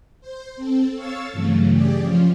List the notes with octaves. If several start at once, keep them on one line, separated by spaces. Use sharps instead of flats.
C5
C4 A4
C#5 F5 C#6 E6 A6
G2 C#3 E3 F#3 A3
G4 G#4 D5
F3 C#4 F4